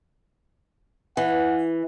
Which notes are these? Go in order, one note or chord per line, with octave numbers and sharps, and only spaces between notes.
E3 F#5